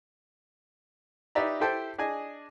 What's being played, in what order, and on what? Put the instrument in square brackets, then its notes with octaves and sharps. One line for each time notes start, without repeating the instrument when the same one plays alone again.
[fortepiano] D#4 G4 B4 D5 E5 A#5
E4 G4 A4 C5 G5 A5
D4 G#4 D#5 G#5